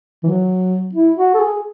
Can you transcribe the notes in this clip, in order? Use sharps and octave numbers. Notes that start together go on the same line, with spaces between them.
E3
F#3
E4
F#4
A4
G#4